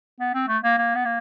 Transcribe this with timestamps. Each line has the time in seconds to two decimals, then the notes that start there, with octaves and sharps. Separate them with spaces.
0.20 B3
0.34 C4
0.48 A3
0.63 A#3
0.78 A#3
0.95 B3
1.05 A#3